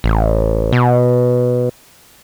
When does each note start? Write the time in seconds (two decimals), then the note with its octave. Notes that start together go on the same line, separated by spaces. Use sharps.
0.04 A1
0.72 B2